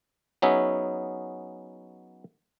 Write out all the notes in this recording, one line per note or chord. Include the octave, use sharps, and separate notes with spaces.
F#3 B3 C#4 D#4 G#4 E5